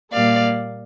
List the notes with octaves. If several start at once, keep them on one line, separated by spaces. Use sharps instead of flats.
A#2 G3 A#3 D5 F5